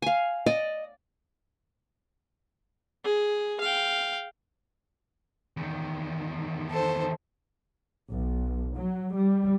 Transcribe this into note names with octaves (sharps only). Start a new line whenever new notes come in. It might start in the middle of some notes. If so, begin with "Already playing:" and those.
F5 G#5
D5 D#5
G#4
F5 G5
E2 D#3
A4 C5
B1
F#3
G3